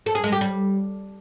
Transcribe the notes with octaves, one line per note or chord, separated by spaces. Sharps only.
A4
G#4
G#3
G4
G3